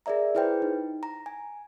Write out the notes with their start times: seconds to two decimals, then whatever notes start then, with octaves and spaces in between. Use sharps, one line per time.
0.06 G#4 A#4 D5 E5 A#5
0.35 E4 G#4 B4 C5 G5
0.62 D#4
1.03 A#5
1.26 G#5